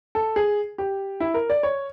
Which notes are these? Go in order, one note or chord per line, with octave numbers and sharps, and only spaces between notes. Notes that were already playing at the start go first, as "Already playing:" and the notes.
A4
G#4
G4
E4
A#4
D5
C#5